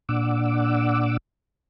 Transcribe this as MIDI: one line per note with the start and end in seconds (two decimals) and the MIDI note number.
0.09 1.17 46
0.09 1.17 62
0.09 1.17 78
0.09 1.17 86
0.09 1.17 88